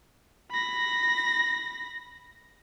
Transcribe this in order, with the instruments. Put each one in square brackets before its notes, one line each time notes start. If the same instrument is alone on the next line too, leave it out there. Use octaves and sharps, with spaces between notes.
[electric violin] B5 A#6